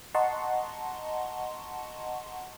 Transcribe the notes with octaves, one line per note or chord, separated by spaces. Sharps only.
D#5 F#5 A5 A#5 C6 C#6